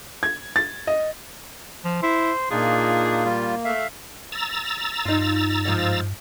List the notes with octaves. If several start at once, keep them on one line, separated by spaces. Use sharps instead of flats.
G#6
A6
D#5
F3
E4 C5
A#2 A#3 D4 D#4 F4 G#4
G3 F4
A3 E5 F5
A#5 E6 A6
G2 D#4 F4
G#2 F3